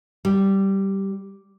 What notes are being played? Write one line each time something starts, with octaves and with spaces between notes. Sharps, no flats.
G3